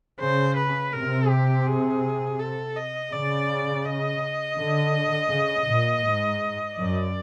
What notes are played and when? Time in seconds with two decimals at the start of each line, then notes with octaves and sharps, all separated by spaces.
0.20 C#3 C5
0.57 B4
0.93 C3 A#4
1.30 G4
1.67 G#4
2.40 A4
2.76 D#5
3.13 C#3 D5
3.85 D#5
4.58 D3
5.31 C#3
5.69 A#2
6.05 G#2
6.78 F#2 D5